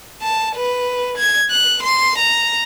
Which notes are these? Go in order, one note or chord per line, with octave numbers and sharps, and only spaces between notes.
A5
B4
G#6
F#6
C6
A#5